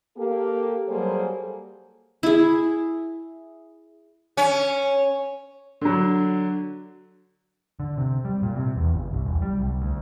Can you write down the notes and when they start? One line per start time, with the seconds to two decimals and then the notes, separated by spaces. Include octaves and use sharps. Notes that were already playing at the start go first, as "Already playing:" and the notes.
0.17 A#3 G4 A4
0.89 F#3 G3 A#3 G#4 A4 C5
2.23 E4 G#4
4.37 C#4
5.81 D3 F#3
7.80 D3
7.98 C3
8.25 G3
8.42 A#2
8.55 C3
8.76 E2
8.94 G1
9.12 C2
9.26 E1
9.42 G3
9.59 C2
9.80 D2